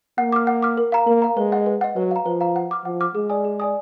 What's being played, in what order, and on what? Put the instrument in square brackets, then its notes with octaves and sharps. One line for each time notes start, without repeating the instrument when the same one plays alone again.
[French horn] A#3 [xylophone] F#5
[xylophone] D6 F6
F#5
D6 F6
A#4
F5 A#5
[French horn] A#3 [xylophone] A#4
[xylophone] F5 A#5
[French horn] G#3 [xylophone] B4
[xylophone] D#5 F#5
B4
D#5 F#5
[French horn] F#3 [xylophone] B4
[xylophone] F5 A#5
[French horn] F3 [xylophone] B4
[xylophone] F5 A#5
F#5
D6 F6
[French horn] F3 [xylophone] F#5
[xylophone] D6 F6
[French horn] G#3 [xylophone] G#4
[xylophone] D5 G#5 D#6
G#4
D5 G#5 D#6